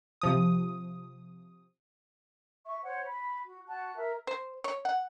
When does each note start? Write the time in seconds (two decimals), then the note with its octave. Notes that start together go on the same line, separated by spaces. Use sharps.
0.21 C3 F3 D#6
2.65 E5 C#6
2.82 C5 C#5 F#5
3.05 B5
3.45 F#4
3.68 F#4 F#5 A5 F#6
3.96 A#4 E5
4.27 C5
4.64 C#5
4.85 F#5